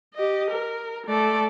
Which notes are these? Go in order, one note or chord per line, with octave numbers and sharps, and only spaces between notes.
G4 D#5
A#4
A3 D5